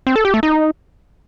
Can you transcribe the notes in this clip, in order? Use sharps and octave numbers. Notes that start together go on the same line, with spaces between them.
C4
A4
G4
A3
D#4